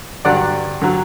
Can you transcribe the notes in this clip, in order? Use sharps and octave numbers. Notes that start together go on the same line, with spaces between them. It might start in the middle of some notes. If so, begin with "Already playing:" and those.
G2 D3 F#3 D5 F#5
D3 F#3